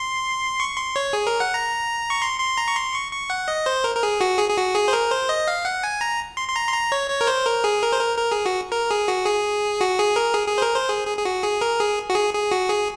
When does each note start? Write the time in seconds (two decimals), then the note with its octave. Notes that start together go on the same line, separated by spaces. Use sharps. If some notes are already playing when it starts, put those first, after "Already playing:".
Already playing: C6
0.60 C#6
0.77 C6
0.96 C#5
1.13 G#4
1.27 A#4
1.40 F#5
1.54 A#5
2.10 C#6
2.22 C6
2.40 C6
2.58 A#5
2.68 C#6
2.76 C6
2.94 C#6
3.12 C#6
3.30 F#5
3.48 D#5
3.66 C5
3.84 A#4
3.96 A#4
4.03 G#4
4.21 F#4
4.39 G#4
4.50 G#4
4.57 F#4
4.75 G#4
4.88 C5
4.93 A#4
5.11 C5
5.29 D#5
5.47 F5
5.65 F#5
5.83 G#5
6.01 A#5
6.37 C6
6.48 C6
6.56 A#5
6.67 C6
6.73 A#5
6.92 C#5
7.10 C#5
7.21 A#4
7.27 C5
7.45 A#4
7.64 G#4
7.82 A#4
7.92 C5
8.00 A#4
8.18 A#4
8.32 G#4
8.46 F#4
8.72 A#4
8.91 G#4
9.08 F#4
9.26 G#4
9.81 F#4
9.98 G#4
10.16 A#4
10.35 G#4
10.48 G#4
10.58 C5
10.62 A#4
10.76 C5
10.89 G#4
11.07 G#4
11.18 G#4
11.25 F#4
11.43 G#4
11.61 A#4
11.80 G#4
12.10 F#4
12.15 G#4
12.34 G#4
12.52 F#4
12.69 G#4